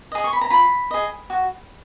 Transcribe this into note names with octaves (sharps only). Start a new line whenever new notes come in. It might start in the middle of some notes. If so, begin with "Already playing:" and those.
G#4 D#5
C#6
B5
A#5
F4 B5
G#4 D#5
F#4